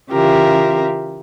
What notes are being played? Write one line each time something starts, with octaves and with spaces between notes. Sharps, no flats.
C#3 E3 F4 G4 A#4 E5